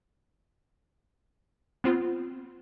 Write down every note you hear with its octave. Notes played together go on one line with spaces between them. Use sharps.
B3 C4 F4